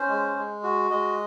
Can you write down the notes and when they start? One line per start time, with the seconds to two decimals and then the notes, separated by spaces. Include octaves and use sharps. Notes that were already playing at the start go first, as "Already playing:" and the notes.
Already playing: C#4 C5
0.08 G#3
0.35 G#3
0.63 F#4
0.90 G#3 D#5